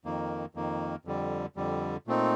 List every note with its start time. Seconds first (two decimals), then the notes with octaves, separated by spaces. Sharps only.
0.05 F2 D#3 A#3
0.55 F2 D#3 A#3
1.05 F2 D3 G3
1.56 F2 D3 G3
2.07 A#2 A3 C4 D#4